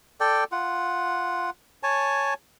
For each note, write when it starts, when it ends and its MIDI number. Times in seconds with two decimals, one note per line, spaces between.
0.20 0.44 69
0.20 0.44 74
0.20 0.44 79
0.52 1.50 65
0.52 1.50 78
1.83 2.34 73
1.83 2.34 80
1.83 2.34 81